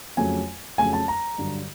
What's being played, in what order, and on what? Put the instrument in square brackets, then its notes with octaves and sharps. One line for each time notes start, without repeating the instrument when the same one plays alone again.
[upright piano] F2 C#3 F#3 A3 G#5
F2 C#3 F#3 A3 G#5
A5
A#5
G2 D3 F#3